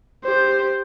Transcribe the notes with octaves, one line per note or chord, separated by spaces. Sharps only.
G4 C5